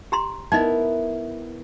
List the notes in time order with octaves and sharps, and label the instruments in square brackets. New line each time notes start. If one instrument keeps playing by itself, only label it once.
[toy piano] G4 A#5 C6
[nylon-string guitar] B3 E4 A#4 [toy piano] D#4 D#5